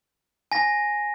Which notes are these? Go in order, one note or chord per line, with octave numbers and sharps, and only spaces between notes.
G#5 A#6